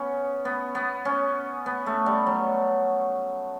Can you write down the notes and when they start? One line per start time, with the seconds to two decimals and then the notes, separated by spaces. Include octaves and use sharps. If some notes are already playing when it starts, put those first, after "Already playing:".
Already playing: B3 C#4
0.45 B3
0.75 B3
1.05 C#4
1.66 B3
1.86 A3
2.06 G3
2.27 F#3